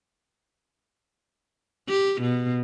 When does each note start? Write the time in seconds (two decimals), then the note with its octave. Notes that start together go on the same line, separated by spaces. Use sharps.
1.88 G4
2.21 B2